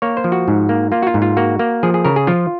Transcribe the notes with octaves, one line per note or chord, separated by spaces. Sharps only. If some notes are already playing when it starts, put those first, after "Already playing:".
A#3 C#5
C5
F3
F#4
G#2
A#3
A#3 F4
F#4
F4
G#2
F4
A#3 F#4
A#3
F3 G#4
G#4
C#3 A#4
G#4
F3 F4